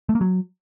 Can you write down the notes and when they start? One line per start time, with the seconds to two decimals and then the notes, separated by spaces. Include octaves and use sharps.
0.09 A3
0.15 A#3
0.21 F#3